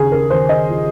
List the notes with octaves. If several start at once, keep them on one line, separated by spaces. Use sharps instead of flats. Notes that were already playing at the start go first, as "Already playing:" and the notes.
Already playing: D#2 C#3 G#4
A#4
D#2 C5
D#5
F3